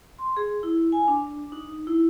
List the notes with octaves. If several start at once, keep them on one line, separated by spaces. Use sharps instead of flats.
C6
G#4
E4
G#5
D4
D#4
E4